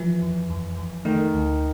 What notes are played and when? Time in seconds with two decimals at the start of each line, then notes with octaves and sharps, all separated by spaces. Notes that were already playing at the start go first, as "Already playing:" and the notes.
Already playing: E3 F3
0.22 F2
0.50 F2
0.77 F2
1.05 D#3 A3
1.33 D2